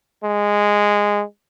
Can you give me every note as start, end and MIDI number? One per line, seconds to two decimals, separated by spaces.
0.23 1.23 56